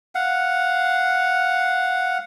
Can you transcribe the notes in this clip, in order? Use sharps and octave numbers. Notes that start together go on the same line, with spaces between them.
F5 F#5